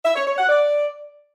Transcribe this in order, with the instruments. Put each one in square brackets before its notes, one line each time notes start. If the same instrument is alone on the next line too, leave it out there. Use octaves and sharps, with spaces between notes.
[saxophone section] E5
C#5
C#5
F#5
D5